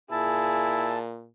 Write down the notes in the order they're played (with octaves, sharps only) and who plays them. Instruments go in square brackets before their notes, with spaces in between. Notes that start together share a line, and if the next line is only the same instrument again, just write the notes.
[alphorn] A#2 [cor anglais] E4 [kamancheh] G#4 [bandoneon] A5